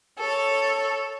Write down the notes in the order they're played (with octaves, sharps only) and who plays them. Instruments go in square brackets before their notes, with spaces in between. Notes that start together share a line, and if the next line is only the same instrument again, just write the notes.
[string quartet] A4 C#5